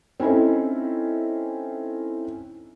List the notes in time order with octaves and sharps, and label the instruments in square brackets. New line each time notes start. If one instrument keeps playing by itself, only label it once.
[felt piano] C4 C#4 D#4 E4 A4